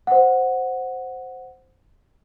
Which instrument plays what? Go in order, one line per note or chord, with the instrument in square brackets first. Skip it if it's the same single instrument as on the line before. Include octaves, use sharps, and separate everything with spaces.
[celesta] C5 F#5